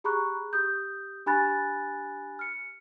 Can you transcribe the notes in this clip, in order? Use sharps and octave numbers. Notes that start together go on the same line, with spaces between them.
G4 G#4 A#5 B5 C#6 F#6
G4 D#6 G6
D4 G4 G#5 B5 F#6 A6
F6 C#7